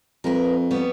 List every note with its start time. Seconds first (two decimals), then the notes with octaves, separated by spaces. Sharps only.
0.24 F2 A#4 B4
0.71 G3 B3 C#5